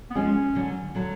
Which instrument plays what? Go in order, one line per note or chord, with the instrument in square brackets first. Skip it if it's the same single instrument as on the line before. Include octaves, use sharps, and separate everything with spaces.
[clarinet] B3
[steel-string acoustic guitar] F3 G#3 [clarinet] C#4
[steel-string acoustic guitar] D3 F#3
D3 F#3